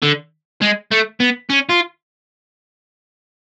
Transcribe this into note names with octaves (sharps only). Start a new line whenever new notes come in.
D3
G#3
A3
B3
C#4
F4